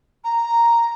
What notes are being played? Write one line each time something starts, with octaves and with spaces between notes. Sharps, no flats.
A#5